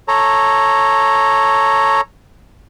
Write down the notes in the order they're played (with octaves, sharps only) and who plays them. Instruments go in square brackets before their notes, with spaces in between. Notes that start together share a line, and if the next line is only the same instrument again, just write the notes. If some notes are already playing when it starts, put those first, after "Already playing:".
[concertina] A4 C#5 A#5